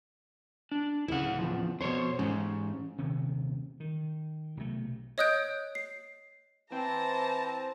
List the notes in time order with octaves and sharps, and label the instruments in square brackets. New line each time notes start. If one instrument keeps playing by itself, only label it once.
[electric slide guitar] D4
[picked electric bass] D1 C#3 [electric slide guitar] E4 F#5
[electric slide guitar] E2 A2 F3
[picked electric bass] F2 B2 [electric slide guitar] C5 C#5
[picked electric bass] G#2 [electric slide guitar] E3 C#4
[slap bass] D#1 C3 D#3 C#4
D#3
B1 C3 A3
[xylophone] C#5 D#5 D#6 F#6 G6 D7
C7
[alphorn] E3 [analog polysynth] C4 [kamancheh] A5 A#5